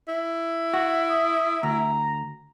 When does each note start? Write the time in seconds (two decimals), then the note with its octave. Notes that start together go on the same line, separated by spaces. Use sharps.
0.08 E4
0.73 F#4
1.10 D#6
1.63 D2 A#5